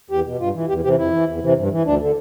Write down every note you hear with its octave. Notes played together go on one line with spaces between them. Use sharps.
E2 G4
B2
G2 F4
E3
E2 G4
C3 E3 G4
F2 E4
E3
E2
C3 E3
G2
E3
D2 D4
D3